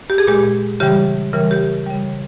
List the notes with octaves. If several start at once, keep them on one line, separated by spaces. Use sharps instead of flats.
G4
G#4
A#2 G#3 G4
C#3 E3 G3 G4
C#3 E3 G3 A#4
G4
C#3 G3